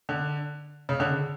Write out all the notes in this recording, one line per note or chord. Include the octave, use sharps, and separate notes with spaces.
D3
C#3
D3